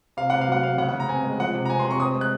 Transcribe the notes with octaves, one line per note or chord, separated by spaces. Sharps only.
C3 F5
C3 F#5
F5
F#3 F#5
C3 F5
C#3 F#5
F#5
C#3
A#5
C4 G#5
G#3
F3 F#5
C3
A#5
C4 G#5
C6
C3
C#6
C4 D#6
G#3
F#6